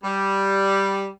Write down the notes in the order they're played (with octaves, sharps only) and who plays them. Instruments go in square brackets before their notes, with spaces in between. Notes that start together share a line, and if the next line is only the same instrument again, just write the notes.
[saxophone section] G3